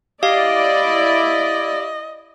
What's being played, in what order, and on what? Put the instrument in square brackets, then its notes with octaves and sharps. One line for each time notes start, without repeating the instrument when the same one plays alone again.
[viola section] E4 D5 [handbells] G4 F5 [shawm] D#5